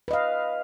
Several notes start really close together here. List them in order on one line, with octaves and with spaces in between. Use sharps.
B4 D#5 F5